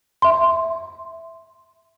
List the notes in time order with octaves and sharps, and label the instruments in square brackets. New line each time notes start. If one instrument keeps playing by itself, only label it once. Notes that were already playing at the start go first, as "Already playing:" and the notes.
[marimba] E5 C6